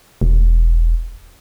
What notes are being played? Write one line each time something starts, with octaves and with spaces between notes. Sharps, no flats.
E1